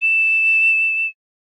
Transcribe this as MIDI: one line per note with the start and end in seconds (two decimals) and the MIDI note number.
0.02 1.07 100